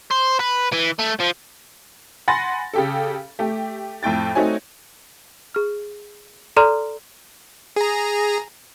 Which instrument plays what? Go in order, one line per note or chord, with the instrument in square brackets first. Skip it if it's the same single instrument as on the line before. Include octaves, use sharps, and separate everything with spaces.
[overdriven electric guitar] C5
B4
E3
A3
F3
[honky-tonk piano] F#5 G#5 B5 C6 A6 A#6
C#3 G4 A4
A3 G4
F2 A2 G5 A6
A3 C4 D#4 F#4 C#5 G#5
[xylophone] G#4 F6
A4 D5 A#5 C6 F6
[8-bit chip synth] G#4 A#5